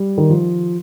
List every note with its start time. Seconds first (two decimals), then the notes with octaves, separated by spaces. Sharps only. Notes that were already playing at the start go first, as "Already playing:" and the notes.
Already playing: G3
0.18 D#3
0.30 F3